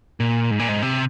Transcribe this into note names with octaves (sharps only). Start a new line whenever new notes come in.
A#2
G#2
A#2
G#2
C3